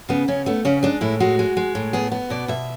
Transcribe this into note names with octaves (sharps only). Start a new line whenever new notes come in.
C#3 B3
C#3 C#4
A3 B3
C#3 C#4
G#3 D4
A2 E4
G#3 F#4
G#3
G#3
A2
B3 G#4
B3
B2 D5
B2 E5